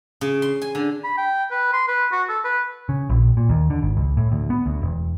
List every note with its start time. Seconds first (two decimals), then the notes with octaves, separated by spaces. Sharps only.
0.21 C#3
0.42 C6
0.62 G#5
0.75 D3
1.04 B5
1.18 G5
1.51 B4
1.73 C6
1.88 B4
2.12 F#4
2.29 A4
2.44 B4
2.89 C#3
3.10 A#1
3.37 A#2
3.49 D#2
3.70 D3
3.82 G#1
3.97 C#2
4.17 A2
4.32 D2
4.50 B3
4.66 D2
4.82 E1